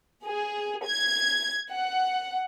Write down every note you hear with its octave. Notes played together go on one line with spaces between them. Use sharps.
G#4
G#6
F#5